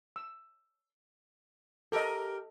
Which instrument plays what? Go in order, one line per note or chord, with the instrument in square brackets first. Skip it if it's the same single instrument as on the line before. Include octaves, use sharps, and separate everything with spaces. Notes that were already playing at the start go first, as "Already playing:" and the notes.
[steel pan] E6
[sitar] G4 A#4 [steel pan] A4 D#5